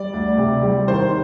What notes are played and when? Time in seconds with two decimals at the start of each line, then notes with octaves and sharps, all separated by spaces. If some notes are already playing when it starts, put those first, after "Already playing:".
Already playing: G3 D5
0.13 D2
0.38 C3
0.63 G3
0.88 D#3 C5